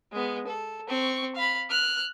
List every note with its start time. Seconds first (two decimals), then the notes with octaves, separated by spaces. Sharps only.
0.13 G#3 B3
0.47 A4
0.89 C4 C#6
1.35 F5 B5
1.71 F6 F#6